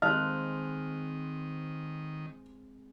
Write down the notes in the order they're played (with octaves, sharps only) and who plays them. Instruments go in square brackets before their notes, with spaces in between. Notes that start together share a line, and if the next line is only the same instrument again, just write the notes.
[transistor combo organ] D#3 [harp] G#3 C4 [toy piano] D#5 F5 A5 [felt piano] F6 F#6